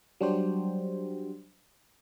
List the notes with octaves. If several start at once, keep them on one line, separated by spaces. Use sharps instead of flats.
F#3 G3 D4 F#4 G4 C5